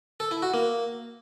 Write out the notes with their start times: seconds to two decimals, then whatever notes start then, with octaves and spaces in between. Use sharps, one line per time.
0.20 A4
0.31 E4
0.42 F#4
0.54 A#3